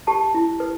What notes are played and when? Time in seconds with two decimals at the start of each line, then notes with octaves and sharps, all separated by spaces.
0.07 G4 A5
0.34 E4
0.60 B4